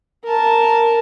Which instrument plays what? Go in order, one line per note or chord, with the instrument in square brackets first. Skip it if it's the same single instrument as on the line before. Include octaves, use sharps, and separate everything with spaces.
[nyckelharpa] A#4 A5